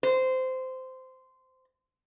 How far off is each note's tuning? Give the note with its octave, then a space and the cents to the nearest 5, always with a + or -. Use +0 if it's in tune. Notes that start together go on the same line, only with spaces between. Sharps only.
C5 -15